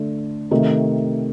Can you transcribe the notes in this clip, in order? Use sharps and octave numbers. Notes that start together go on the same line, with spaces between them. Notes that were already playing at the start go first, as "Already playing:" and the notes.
Already playing: D3 A3
C3 D#3 A3